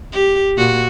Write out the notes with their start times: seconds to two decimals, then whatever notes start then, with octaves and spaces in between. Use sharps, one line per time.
0.12 G4
0.57 A#2 F#4